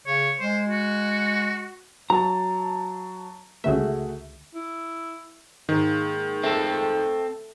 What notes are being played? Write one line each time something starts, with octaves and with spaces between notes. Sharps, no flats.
C#3 C#5
G#3 C5
F#4
F#3 A5 A#5
C#2 D3 A3 F#4 G#4 E5
E4
G#2 D#3 A#3
A3 C4 A4